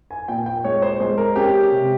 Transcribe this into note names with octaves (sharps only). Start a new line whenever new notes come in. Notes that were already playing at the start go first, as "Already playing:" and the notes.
G#5
A#2 G5
G5
G#3 C#5
C5
G#3 C5
A#4
C#4 G4
C3